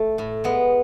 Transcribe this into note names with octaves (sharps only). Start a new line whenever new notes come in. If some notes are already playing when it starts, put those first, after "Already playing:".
Already playing: A3
A2
G#3 B3